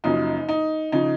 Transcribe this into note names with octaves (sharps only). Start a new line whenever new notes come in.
F#1 F#2 C#3 F3 D#4
D#4
C#3 F3 D#4